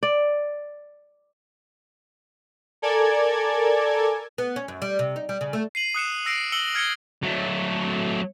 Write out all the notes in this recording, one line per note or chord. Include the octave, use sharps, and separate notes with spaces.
D5
A4 A#4 D5 G#5 G#6
B3
C#4
F#2
G3
C3
D#4
G3
C#3
A3
C7 D#7 F#7
D#6 F#6 C#7 E7
E6 A#6 C7 D7
E6 C#7 F#7 G7
F6 G#6 A#6 C#7 G7
F#3 A3